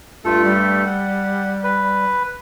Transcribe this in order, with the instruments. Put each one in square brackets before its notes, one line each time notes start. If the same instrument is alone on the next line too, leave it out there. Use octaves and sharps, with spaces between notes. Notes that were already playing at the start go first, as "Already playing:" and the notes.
[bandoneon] G2 A3 A4 [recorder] F4
[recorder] G3
[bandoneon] F#5
B4